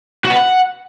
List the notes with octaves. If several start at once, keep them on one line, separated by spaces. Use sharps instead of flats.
F#4
B4
F#5